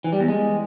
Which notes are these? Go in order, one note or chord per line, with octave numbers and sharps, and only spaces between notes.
E3
G3
E2
G#3